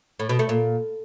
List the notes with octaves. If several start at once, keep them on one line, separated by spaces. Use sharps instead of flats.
A2
B2
A3
A#2